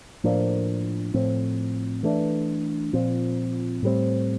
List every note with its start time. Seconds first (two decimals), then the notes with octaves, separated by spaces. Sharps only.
0.24 A2 F3 A#3 D4
1.14 A2 F3 C4
2.03 E3 A3 D4
2.93 A#2 F3 C4
3.83 A2 G3 C4